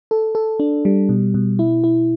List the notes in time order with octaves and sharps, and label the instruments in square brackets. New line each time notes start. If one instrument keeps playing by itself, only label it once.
[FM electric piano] A4
A4
D4
G3
B2
B2
E4
E4